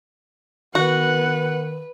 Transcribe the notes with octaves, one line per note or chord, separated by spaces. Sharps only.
D#3 B3 F#4 B4 F#5